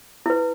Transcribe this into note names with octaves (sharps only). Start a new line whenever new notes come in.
E4 B4